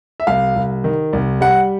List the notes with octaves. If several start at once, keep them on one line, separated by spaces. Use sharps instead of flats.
E5
C2 F5
C2
D#3
C2
G3 F#5